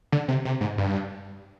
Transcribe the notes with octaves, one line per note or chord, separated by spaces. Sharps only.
D3
C3
C3
G#2
G2